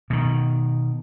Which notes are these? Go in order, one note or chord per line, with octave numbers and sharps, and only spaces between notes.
B2 D#3